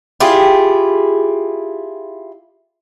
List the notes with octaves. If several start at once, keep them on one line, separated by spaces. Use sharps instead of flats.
E4 F4 G4 G#4